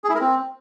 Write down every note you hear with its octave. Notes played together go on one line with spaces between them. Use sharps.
G#4
E4
A#4
C4